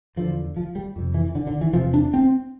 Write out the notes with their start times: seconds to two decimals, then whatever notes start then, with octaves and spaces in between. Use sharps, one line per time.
0.16 E2 D3 F3
0.57 F3
0.75 G3
0.96 F2 C3
1.14 E3
1.35 D3
1.47 D3
1.61 E3
1.73 E2 C3 F3
1.94 D4
2.14 C4